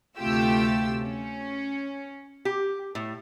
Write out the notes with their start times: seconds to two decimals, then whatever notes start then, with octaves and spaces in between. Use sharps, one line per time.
0.18 D2 C3 A3 F4 G4 E6
1.03 C#4
2.45 G4
2.95 A2